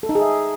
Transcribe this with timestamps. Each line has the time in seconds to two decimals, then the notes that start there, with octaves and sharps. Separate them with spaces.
0.03 A4
0.09 D#4
0.15 G#4
0.21 E5